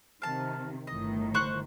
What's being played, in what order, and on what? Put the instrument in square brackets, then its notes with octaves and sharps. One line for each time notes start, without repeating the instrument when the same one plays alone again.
[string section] C3 D#3 [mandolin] F5 A5
[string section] G1 A2 D#3 [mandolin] D#5
[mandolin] C5 C#6 F#6